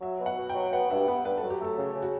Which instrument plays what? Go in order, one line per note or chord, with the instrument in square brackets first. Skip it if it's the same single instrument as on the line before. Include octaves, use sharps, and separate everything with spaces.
[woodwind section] F#3 [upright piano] E5
[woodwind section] B2
[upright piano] F#5
[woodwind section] B2
[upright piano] G5
[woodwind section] F#3
[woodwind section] B3 [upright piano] F#5
[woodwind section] G2 [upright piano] E5
[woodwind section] B3 [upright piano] B4
[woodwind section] G2 [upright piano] B4
[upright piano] A4
[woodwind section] F#3
[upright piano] G4
[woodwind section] A3 [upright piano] A4
[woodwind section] C#3
C#3
[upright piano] F#4